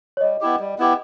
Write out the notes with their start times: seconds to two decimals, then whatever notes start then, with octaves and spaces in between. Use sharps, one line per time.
0.17 C#5
0.21 G3 D#5
0.41 B3 E4 G4
0.59 G3
0.79 B3 E4 G4